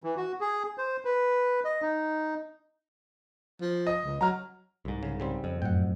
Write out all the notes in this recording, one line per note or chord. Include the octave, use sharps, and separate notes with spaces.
E3
F#4
G#4
C5
B4
D#5
D#4
F3
D#5
C#2
F#3 A#5 F6
C2 G#2
C#3
C#3 G3 C4
F2
F#2 A2 F#5 G5